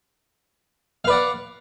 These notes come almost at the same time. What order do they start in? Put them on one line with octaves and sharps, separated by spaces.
F5 B4 D5 F#5